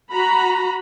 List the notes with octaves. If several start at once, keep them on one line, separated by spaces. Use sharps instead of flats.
F#4 A#5 B5